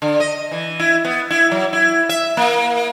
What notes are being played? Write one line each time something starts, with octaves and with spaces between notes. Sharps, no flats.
D3
D#5
E3
E4
B3
E4
F#3
E4
E5
A#3